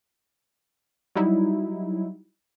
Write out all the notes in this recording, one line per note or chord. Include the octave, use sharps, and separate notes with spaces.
F#3 G3 D#4 E4